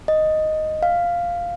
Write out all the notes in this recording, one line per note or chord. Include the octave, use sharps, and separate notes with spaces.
D#5
F5